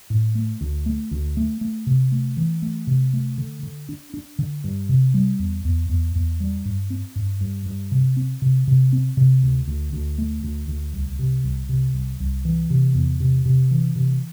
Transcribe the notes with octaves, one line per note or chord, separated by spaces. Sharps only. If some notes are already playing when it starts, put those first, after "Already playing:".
A2
A3
D2
A3
D2
A3
A3
C3
A3
E3
A3
C3
A3
D3
D3
D4
D4
D3
G2
C3
G3
E2
E2
E2
E2
G3
G2
C4
G2
G2
G2
C3
C4
C3
C3
C4
C3
D2
D2
D2
A3
D2
D2
C2
C3
C2
C3
C2
C2
E3
C3
E2
C3
C3
E3
C3